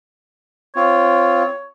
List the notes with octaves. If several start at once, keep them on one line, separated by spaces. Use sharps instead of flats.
C4 F4 C#5